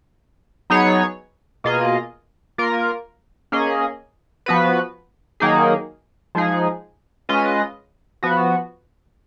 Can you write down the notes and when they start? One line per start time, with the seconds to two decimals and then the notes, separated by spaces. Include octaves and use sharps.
0.70 F#3 B3 D#4 G#4 C#5
1.64 B2 A#3 F4 G#4 D#5
2.58 A#3 F4 A#4
3.52 A#3 C#4 G#4 D#5
4.46 F3 B3 F#4 B4
5.40 D#3 F#3 A#3 D#4 G#4
6.35 F3 G#3 D#4 G#4
7.29 G#3 C#4 F4 B4 D#5
8.23 F3 B3 F#4